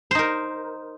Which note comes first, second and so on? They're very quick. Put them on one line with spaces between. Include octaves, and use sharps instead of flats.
C5 D#4 A#4